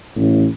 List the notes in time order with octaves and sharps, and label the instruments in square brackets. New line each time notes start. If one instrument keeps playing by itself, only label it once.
[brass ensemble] A1